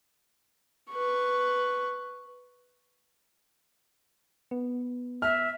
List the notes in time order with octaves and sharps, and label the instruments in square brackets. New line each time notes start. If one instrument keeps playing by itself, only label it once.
[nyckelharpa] B4 C#6
[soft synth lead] B3
[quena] E5 [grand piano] F6